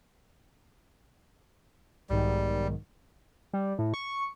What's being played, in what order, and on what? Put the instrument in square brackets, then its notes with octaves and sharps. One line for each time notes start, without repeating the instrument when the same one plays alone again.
[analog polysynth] B1 G#2 D#3 [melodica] G3
[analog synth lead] G3
A2
C#6